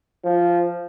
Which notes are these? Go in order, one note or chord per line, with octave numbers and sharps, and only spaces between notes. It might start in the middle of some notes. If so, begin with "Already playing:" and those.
F3